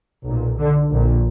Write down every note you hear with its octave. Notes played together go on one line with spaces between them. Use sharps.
B1 A#2
D3
A#1 A#2